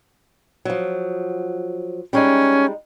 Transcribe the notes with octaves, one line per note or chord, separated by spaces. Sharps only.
F3 F#3
G3 G#3 C#4 D#4